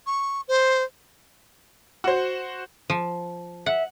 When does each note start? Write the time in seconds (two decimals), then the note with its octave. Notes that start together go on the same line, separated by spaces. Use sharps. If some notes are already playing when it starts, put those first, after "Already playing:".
0.07 C#6
0.48 C5
2.04 F#4 C5
2.90 F3
3.66 E5 F#5